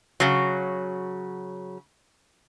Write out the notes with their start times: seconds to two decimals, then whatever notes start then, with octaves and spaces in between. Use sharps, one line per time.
0.20 C#3 F#3